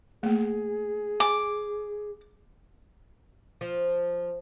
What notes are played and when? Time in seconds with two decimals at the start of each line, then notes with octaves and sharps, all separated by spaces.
0.23 A3 A#3 G#4
1.20 G#5 D6
3.61 F3